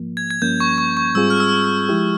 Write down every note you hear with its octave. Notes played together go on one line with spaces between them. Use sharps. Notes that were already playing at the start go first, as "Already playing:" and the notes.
Already playing: G#2 F3 A#3
G#6
G#6
G2 F3 A#3 C#4 G6
C#6
C#6
C#6
G#2 G3 C4 F4 G#4 E6
F6
E6
E6
F3 G#3 E4 G4